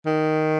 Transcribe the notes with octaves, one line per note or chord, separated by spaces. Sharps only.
D#3